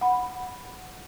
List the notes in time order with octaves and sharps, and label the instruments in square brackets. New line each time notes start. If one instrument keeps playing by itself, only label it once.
[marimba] F#5 B5